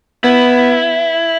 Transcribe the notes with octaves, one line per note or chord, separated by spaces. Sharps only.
B3 E4